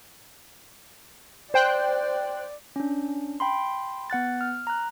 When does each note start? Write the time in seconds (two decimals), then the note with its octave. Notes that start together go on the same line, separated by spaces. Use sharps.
1.54 C5 D5 G5 F#6
2.76 C#4 D4
3.40 G5 B5 C6
4.10 B3 F#5 F#6 A6
4.41 F6
4.67 A#5 F#6